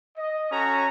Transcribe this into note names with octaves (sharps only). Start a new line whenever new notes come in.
D#5
C#4 F#4 A4 A#5